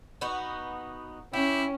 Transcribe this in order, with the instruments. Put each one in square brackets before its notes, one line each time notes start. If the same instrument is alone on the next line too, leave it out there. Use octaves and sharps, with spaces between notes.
[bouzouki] B3 D#4 F#4
[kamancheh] C#4 [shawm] E4 [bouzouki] G4